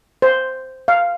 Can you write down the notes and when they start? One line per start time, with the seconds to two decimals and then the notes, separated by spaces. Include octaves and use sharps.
0.22 C5
0.88 F5